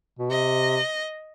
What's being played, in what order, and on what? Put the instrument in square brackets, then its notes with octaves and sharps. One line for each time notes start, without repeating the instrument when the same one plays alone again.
[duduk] B2
[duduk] C3 [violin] D#5